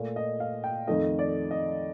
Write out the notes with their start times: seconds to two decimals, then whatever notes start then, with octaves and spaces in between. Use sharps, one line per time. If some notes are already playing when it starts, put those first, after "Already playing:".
Already playing: A#2 A3
0.16 D#5
0.40 F5
0.64 G5
0.87 F2 D#3 A3 D#5
1.19 D5
1.51 D#5